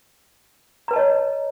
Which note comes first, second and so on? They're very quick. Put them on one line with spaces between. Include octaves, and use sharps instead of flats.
A#5 B4 A5 D#5 C#5